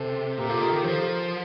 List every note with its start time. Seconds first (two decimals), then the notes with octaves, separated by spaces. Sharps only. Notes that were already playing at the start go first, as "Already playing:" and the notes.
Already playing: C3 A4 C5
0.37 A#2 G4 A#4
0.49 C3 F4 A4
0.61 D#3 G4 A#4
0.72 D#3 G4 A#4
0.83 F3 A4 C5